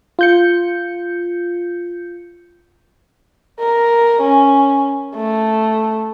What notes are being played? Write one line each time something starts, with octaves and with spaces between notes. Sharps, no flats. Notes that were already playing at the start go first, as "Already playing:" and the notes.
F4 G6 C#7
A#4
C#4
A3